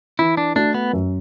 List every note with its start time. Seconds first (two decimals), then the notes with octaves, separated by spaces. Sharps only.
0.19 E3 E4
0.37 D4
0.56 A3 D4 F#4
0.74 B3
0.93 F#2